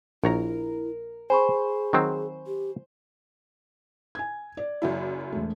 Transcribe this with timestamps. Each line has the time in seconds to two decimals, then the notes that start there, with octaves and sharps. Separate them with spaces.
0.24 A#1 E4 A#4 C#5 A#5
1.30 G#4 C5 G#5 B5 C#6
1.93 D#3 F#3 C4
2.47 G4
4.15 G#5 G#6
4.57 D5
4.82 F#1 F#2 E4
5.32 E1 A3